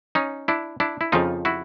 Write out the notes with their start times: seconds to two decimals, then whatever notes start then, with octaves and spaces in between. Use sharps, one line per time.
0.15 C#4 D#4
0.48 D4 E4
0.80 D4 E4
1.01 E4
1.12 F2 C#3 F3 D#4 F4
1.45 E4 F#4